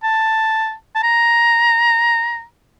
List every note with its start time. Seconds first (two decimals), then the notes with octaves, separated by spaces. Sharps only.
0.03 A5
0.96 A5
1.03 A#5